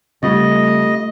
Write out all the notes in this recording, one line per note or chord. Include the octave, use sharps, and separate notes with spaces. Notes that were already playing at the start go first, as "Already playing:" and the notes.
C#3 G3 A3 C4 F4 G4 D#5